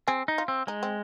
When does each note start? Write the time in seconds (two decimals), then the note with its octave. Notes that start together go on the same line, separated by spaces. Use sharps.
0.07 C4 G#4
0.28 D#4
0.38 F4
0.48 C4
0.67 G#3 D#4
0.83 C4